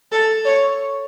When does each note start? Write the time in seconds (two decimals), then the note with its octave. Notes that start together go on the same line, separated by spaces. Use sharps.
0.12 A4
0.45 C#5